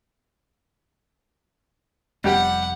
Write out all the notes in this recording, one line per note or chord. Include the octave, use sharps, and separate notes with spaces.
F1 G3 G4 F#5 G5